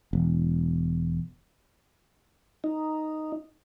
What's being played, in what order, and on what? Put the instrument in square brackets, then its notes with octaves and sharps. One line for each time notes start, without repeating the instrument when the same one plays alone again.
[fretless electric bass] E1
[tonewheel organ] D#4